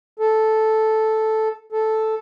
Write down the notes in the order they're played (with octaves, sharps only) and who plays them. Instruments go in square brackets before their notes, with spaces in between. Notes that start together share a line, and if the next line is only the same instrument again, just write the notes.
[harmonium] A4
A4